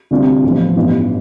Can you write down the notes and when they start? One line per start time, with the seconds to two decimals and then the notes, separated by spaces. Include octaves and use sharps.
0.11 D2 C3 G3 D4 F4
0.44 A1 A2 F3 B3
0.76 A1 G2 E3 B3 F4